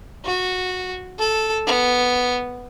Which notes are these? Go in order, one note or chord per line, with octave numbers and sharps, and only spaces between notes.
F#4
A4
B3